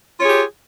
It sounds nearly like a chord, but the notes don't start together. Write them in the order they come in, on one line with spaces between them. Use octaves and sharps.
F4 C#5 G#4 G4